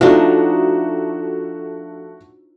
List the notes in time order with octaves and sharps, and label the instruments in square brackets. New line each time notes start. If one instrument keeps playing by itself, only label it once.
[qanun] F3 D4 D#4 [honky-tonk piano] A3 F#4